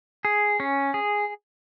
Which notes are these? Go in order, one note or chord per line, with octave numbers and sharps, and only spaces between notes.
G#4
C#4
G#4